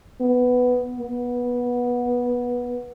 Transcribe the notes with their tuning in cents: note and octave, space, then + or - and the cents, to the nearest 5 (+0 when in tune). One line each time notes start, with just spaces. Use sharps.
B3 +5
B3 -15